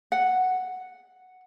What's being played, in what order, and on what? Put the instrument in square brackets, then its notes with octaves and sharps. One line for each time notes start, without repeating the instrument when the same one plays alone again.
[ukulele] F#5